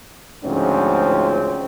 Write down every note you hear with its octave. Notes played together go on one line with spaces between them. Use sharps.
D2 G#2 C#3 F3 C4 C#4